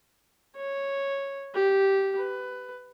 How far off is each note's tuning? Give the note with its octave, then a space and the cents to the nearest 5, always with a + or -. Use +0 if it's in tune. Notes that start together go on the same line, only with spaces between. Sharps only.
C#5 -5
G4 -10
B4 +15